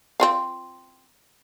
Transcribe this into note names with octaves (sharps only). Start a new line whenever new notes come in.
C4 F4 F5